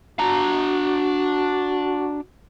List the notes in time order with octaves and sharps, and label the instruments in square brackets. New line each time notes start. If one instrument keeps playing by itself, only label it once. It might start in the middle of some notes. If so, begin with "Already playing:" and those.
[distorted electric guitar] D4 A#5 [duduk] F#4